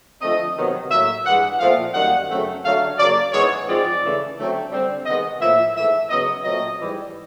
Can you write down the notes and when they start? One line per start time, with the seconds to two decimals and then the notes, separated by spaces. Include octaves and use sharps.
0.20 D3 F3 A3 C4 D#5
0.56 C3 D#3 F#3 B3
0.90 A2 F#3 A#3 E5
1.25 G2 E3 G#3 F#5
1.59 A#2 F3 A3 C4 F5
1.94 F#2 D#3 G3 A#3 F#5
2.29 F#2 C#3 F#3 A3 C4
2.63 D3 F#3 A3 F5
2.98 C#3 F#3 A#3 D5
3.32 G#2 E3 G#3 B3 C#5
3.67 G#2 F3 G#3 C4 D5
4.03 C#3 E3 A3
4.37 D3 F#3 A3 C4
4.72 D3 G3 C4
5.06 C3 D#3 G#3 B3 D#5
5.40 A2 F3 A#3 E5
5.75 G#2 E3 A3 E5
6.10 C#3 F#3 B3 D#5
6.44 A#2 F#3 A3 C4 D#5
6.80 G#2 E3 G3